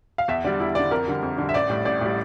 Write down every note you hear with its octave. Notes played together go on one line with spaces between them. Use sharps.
F5
E2 E5
D3 G3 D5
E2 E4
D3 G3 D5
F2 A#4
D3 G3
F2
D3 G3
E5
A1 D5
A2 G3
A1 D5
A2 G3